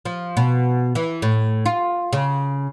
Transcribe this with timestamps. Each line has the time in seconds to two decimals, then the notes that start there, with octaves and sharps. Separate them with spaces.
0.05 F3
0.37 B2
0.95 E3
1.22 A2
1.66 F4
2.13 C#3